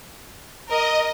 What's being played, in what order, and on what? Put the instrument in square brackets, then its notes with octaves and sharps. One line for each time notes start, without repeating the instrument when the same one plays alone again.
[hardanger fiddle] A#4 [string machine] D#5